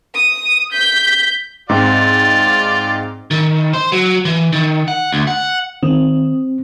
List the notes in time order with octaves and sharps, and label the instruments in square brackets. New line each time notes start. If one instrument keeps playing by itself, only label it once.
[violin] D#6
G6 B6
[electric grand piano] G#2 C4 [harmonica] F4 D5
[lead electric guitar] D#3
C5
F#3
E3
D#3
F#5
D2
F#5
[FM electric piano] D#3 [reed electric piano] C4